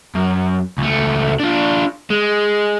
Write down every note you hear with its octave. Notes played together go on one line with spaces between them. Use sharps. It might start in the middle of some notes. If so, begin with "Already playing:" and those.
F#2
C#2 A3
D4 F4
G#3